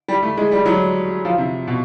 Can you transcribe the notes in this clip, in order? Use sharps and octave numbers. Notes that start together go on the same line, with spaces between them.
G3
A3
G#3
G3
F#3
F3
C3
B2